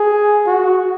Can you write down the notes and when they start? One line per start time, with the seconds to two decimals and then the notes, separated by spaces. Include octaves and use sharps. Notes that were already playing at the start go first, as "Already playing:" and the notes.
Already playing: G#4
0.47 F#4